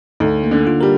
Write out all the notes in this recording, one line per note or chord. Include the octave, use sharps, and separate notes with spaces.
D2 D#4
A#3
D3
F4
G3 A#4